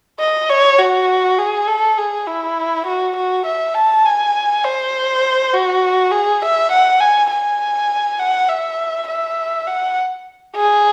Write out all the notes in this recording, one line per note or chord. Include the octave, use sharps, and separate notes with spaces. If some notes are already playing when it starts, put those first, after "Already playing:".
D#5
C#5
F#4
G#4
A4
G#4
E4
F#4
F#4
E5
A5
G#5
C5
F#4
G#4
E5
F#5
G#5
G#5
F#5
E5
E5
F#5
G#4